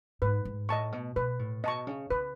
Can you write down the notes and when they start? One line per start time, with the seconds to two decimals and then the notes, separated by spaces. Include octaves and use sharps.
0.22 G#2 B4
0.45 G#2
0.69 A2 D#5 A5 C#6
0.92 B2
1.16 B2 B4
1.39 A2
1.64 B2 D#5 A5 C#6
1.87 C#3
2.10 C#3 B4